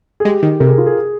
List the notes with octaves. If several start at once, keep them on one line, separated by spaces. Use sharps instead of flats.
G#4
G#3 G4
D#3
C3 A#4
G#4
F4
G#4